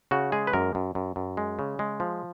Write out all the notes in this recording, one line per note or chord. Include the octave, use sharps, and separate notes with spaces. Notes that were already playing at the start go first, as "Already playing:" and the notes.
C#3 F#4
G#3 G#4
B4
F#2 A#4
F#2
F#2
F#2
G#3
C#3
G#3
F3